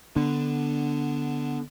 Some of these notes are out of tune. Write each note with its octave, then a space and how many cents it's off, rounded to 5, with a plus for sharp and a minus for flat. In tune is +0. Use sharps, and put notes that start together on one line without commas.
D3 +5 B3 +0 D4 +0